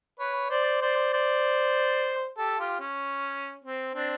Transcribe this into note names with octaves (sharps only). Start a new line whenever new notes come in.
B4 C#5
C5 D5
C5 D5
C5 D5
G4 A4
F4 G4
C#4
C4
C4 D4